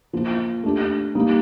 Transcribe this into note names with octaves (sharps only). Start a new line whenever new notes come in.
F3 A#3 F4
A3 D4 G4
G3 A#3 D#4